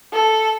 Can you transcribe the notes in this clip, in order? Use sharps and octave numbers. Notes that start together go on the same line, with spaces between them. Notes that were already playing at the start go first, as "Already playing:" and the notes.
A4